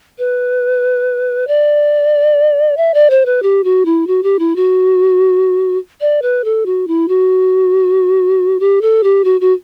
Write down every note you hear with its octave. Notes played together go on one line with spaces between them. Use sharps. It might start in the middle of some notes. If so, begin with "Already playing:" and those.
B4
D5
E5
D5
C5
B4
G4
F#4
E4
F#4
G4
E4
F#4
D5
B4
A4
F#4
E4
F#4
G4
A4
G4
F#4
F#4